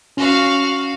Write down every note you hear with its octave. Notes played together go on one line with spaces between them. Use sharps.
C#4 F#4 F5